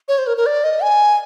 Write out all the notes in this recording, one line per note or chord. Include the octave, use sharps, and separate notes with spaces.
C#5
C5
A#4
A#4
D5
D#5
G#5